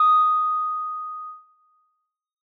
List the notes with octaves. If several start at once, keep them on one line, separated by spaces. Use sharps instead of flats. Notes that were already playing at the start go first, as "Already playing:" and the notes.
Already playing: D#6